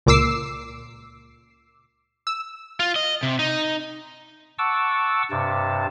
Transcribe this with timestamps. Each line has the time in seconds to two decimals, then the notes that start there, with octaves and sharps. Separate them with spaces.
0.06 C#2 A#2 D6 E6 C7
2.27 E6
2.80 F4
2.96 D#5
3.23 C3
3.39 D#4
4.58 F#5 A5 C#6 D6 E6
5.31 G2 C3 A5